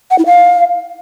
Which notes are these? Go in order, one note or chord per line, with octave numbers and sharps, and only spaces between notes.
F#5
E4
F5